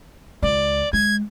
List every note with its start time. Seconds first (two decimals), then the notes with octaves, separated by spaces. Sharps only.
0.43 C#2 D5
0.93 G#3 G#6